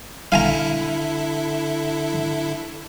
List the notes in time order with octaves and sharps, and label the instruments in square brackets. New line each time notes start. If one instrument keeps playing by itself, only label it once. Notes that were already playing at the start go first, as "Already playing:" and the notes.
[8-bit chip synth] D3 E4 A4 [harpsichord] F5 G#5 A#5